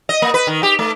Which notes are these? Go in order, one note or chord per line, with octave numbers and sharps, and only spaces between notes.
D#5
A#3
B4
D#3
G4
A3